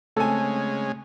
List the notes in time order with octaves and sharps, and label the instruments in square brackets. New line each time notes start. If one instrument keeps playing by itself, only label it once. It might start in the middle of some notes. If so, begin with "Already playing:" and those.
[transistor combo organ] C#3 G#3 [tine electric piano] A3 C4 [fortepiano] A4 G#5